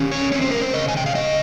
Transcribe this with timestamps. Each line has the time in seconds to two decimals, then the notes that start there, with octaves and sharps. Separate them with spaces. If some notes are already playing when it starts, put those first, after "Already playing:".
Already playing: D#3 C#4
0.12 C#5
0.32 C4 C#5
0.42 C5
0.51 A#4
0.62 C5
0.73 C#3 D#5
0.88 G#5
0.97 G5
1.06 F5
1.15 C#3 D#5